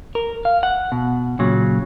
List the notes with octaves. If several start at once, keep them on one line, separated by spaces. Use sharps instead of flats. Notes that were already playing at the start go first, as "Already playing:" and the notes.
A#4
F5
F#5
B2
A#2 C#3 F#3